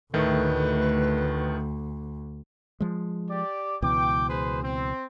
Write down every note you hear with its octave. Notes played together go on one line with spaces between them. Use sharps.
D2 A2 D#3 A3 B4
F3 G#3
G4 D5
C#2 B2 E3 G5 D6
G#4 B4 C5
C4